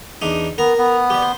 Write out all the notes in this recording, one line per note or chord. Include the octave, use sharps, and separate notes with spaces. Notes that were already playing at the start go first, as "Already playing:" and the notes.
E2 D4 D#4
B3 A#4 A#5
B3
G4 D5
C5